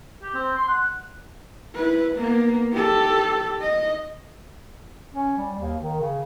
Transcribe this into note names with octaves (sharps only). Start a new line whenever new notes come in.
G4
C4
C6
F#5
E4 B4
A#3 B3
G4 A4
D#5
C#4
G3
D#2
D#3
C#3